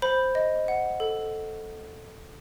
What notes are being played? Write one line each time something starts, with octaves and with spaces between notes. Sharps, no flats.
C5 B5
D#5
F#5
A4